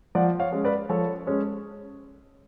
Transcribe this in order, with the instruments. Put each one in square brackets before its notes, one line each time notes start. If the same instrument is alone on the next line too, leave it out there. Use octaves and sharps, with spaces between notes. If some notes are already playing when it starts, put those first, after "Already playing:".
[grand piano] F3 D5 F#5
C#5 F5
G#3 C#4
B4 D5
F3 A4 C#5
G#3 C#4